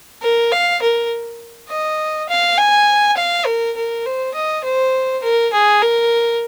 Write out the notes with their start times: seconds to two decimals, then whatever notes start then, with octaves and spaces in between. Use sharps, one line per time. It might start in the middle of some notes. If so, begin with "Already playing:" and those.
0.22 A#4
0.52 F5
0.82 A#4
1.69 D#5
2.29 F5
2.58 G#5
3.17 F5
3.46 A#4
3.76 A#4
4.06 C5
4.34 D#5
4.64 C5
5.23 A#4
5.53 G#4
5.82 A#4